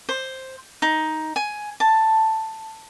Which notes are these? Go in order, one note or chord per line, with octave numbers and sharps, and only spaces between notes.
C5
D#4
G#5
A5